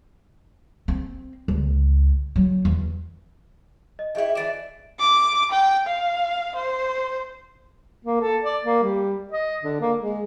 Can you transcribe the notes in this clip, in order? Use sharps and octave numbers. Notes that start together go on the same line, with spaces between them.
C4
C#2
F#3
E2
D#5
E4 G4 G#4 D#5 E5
E3 F3 D5 A6 D7 E7
D6
G5
F5
C5
A#3
A4
D5
A#3
G3
D#5
D3
A#3
G#3